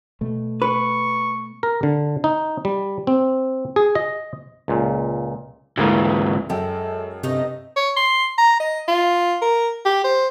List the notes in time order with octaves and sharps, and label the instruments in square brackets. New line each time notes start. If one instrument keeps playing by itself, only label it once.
[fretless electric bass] B2 A3
[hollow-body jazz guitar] B4 [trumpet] C#6
[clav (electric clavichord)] A#4
D3
D#4
G3
C4
G#4
D#5
C#2 A#2
[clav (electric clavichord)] D2 A#3 [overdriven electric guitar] G#2 E3
[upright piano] F#2 G5 [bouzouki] G#3 [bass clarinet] A4
[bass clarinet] G2 [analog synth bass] C3 [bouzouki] A3 D#4 D#5
[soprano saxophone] C#5
C6
A#5
D#5
F4
A#4
G4
C5